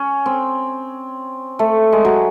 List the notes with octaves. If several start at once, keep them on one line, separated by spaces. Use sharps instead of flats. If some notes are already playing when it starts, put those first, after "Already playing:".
Already playing: C#4
C4
A3
G#3
F#3